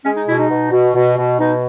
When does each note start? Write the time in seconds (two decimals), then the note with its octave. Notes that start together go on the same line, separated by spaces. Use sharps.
0.04 G#3 C#4
0.16 D#4
0.27 B2 E4
0.38 D#4
0.50 B2
0.71 B2
0.95 B2
1.17 B2
1.39 B2 D#4